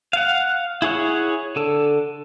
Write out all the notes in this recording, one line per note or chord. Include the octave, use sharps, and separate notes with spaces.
F5 F#5
E4 G#4 C#5 F#5
D3 A4